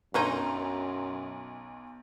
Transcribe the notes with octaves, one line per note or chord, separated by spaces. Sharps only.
B1 F#2 D3 C#4 D#4 A#5 C6